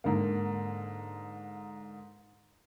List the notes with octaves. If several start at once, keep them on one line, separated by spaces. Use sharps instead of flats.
G#2 D3 A#3